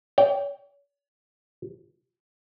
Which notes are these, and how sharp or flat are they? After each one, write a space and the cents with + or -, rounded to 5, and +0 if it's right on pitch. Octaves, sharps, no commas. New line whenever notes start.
C#5 +45 G5 +0